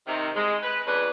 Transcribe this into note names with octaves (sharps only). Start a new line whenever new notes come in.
C3 D#3
G#3
B4
F2 C#4 D4 G#4 B4